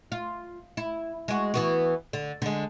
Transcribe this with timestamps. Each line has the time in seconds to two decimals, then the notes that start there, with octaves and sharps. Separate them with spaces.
0.12 F4
0.77 E4
1.28 G#3 F#4
1.54 E3 B3 F#4
2.13 D3
2.42 D3 G#3